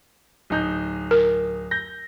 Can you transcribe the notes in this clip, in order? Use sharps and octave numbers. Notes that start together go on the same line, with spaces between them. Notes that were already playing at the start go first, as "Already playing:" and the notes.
D1 D#4 G6
A#4
G6 A#6